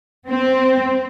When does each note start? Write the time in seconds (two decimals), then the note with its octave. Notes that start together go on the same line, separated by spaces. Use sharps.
0.29 C4